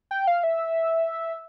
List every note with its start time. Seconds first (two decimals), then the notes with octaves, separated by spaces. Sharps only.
0.11 G5
0.27 F5
0.44 E5